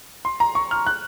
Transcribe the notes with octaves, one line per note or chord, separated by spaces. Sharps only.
C6
A#5
C#6
F6
F#6